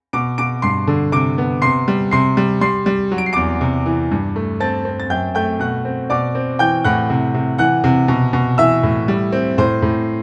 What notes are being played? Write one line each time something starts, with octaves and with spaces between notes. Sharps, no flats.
B2 D6 D7
B2 D6 D7
G2 C6 C7
D3
C3 D6 D7
B3
C3 C6 C7
G3
C3 C6 C7
G3
G3 C6 C7
G3
F#3
D7
C7
E2 D6 D7
C3
E3
G2
A3
C4 A5 A6
C4
A6
F#2 G5 G6
A3 G5 G6
B2 F#5 F#6
C4
B2 D5 D6
C4
E3 G5 G6
A2 F#5 F#6
C3
C3
E3 F#5 F#6
C3
B2
B2
E3 E5 E6
A2
G3
C4
A2 C5 C6
A2